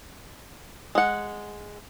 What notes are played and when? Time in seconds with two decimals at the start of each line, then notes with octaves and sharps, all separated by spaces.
0.95 G#3 F#5